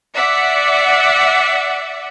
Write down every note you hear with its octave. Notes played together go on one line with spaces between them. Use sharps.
D5 E5 F#5